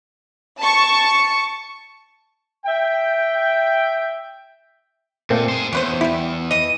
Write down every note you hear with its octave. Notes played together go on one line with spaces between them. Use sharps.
A5 C#6
E5 G5
A#2 A3 A#3 C4
G#4 C5
E2 C#4 B4 C5
G3 E4 G4
E3 D#5 D#7